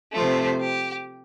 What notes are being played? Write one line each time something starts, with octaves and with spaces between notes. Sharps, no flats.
C3 F3 A3 C5
G4